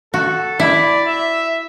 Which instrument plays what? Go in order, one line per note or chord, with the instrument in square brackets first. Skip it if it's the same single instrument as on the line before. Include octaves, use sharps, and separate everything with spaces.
[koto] F#4 [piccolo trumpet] A4
[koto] E4 [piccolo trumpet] D5
[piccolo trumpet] E5